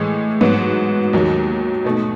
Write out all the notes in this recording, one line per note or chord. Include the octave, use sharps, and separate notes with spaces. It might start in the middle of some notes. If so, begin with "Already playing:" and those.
Already playing: A2 E3 G#3
G#2 F#3 B3 F#4
D#2 D#3 F#3
B2 A3 D#4